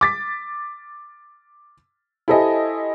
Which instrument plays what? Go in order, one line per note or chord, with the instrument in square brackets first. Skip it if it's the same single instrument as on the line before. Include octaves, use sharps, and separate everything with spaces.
[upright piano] D6 A6 B6
E4 G4 A4 C5 D#5 G#5